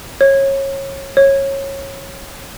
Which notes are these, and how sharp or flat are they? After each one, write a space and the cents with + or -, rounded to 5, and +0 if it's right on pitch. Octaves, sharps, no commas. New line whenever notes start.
C#5 -25
C#5 -20